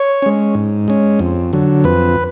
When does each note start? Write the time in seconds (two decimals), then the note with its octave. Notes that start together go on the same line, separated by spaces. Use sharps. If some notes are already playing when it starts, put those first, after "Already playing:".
Already playing: C#5
0.22 G#3 C#4
0.55 G#2
0.88 G#3 C#4
1.19 F2
1.53 D3 F#3
1.84 F2 B4